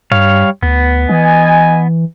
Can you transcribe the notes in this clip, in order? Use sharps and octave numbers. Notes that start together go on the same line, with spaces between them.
G2 G3 C#5 F5
D2 B3
E3 D#5 G#5